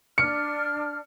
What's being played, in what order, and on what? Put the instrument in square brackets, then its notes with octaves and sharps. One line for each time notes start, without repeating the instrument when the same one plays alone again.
[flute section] D4 F6 [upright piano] C#7